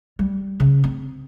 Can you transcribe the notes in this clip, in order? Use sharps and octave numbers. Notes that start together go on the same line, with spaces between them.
G3
C#3
C4